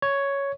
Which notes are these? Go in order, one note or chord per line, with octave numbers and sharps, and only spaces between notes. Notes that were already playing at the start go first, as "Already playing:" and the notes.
C#5